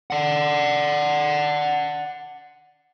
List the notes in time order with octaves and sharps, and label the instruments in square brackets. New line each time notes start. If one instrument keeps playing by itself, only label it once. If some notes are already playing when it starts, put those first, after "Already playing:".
[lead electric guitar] D5 F#5